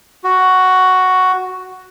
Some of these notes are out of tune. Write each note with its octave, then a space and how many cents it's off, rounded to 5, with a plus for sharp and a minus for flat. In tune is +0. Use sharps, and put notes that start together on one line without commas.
F#4 +5